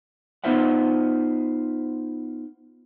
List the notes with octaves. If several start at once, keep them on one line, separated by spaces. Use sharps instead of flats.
B3 D#4 F4 C5 E5 F#5